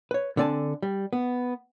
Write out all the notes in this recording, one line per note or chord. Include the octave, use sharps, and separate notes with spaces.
B4 C#5
D3 C4 D5 G#5 A5
G3
B3